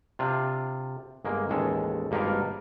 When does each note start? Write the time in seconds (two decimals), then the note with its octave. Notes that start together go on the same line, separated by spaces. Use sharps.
0.19 C3 D4 F4
1.25 G1 G#3 A#3
1.49 A1 D#2 G#3 A4 A5
2.11 G#1 G2 A#3 D#4 F4 A#4